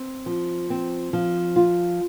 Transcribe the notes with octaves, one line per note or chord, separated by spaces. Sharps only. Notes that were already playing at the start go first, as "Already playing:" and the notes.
Already playing: C4
F3
C4
F3
F4